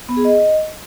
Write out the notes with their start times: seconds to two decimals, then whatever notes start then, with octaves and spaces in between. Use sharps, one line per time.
0.09 B3
0.17 G#4
0.25 D#5